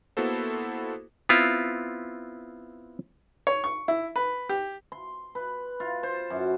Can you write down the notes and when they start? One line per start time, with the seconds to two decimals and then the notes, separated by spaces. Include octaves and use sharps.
0.17 A#3 B3 E4 F#4 A4 C5
1.29 B3 C4 E4 F4
3.47 C#5
3.64 C#6
3.88 E4
4.16 B4
4.49 G4
4.92 C6
5.35 B4
5.80 F4
6.03 C5
6.30 F#2